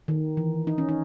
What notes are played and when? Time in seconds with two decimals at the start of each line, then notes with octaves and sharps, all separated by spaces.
0.08 D#3
0.37 E3
0.67 D#4
0.78 C#4
0.89 D#4